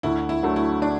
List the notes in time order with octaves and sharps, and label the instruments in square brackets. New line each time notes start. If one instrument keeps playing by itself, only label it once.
[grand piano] D2 [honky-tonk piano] E4
[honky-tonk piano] E4
[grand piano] D3 F#3 A3
[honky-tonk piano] E4
D4